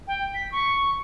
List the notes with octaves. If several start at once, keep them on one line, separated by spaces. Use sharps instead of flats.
G5
B6
C#6